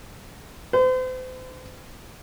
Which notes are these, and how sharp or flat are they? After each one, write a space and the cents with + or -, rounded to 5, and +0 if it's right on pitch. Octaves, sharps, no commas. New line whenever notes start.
C5 -40